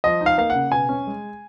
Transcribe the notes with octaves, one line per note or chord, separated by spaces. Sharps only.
F3 D#5
D#4
F5
A#3 F5
F#5
C#3
B2 G#5
C#4
G#3